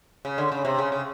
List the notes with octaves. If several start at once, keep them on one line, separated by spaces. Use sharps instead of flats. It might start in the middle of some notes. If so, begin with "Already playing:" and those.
C#3
D3
C#3
C3
C#3
C#3